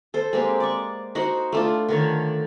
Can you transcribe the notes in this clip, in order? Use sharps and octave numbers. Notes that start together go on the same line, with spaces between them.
A4 C5
G#3 A#3 C4 G4
D5 C#6
D#4 F#4 C5 F#5
A3 D4 F4
D3 D#3 C#5